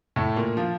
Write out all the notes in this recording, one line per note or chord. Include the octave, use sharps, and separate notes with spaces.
A2 A3
A#2 A#3
F3 F4